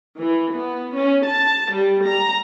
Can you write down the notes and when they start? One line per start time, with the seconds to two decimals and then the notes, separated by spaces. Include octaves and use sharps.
0.20 E3
0.58 B3
0.98 C#4
1.28 A5
1.75 G3
2.08 A#5